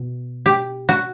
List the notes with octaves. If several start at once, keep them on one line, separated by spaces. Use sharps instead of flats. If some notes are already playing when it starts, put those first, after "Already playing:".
Already playing: B2
G4
F#4